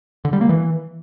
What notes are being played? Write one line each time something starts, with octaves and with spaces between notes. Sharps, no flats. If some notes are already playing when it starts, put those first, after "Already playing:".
D3
G3
A#3
E3